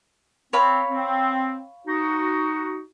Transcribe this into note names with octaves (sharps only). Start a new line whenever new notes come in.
C4 C#5 F5 B5
C4
D#4 F#4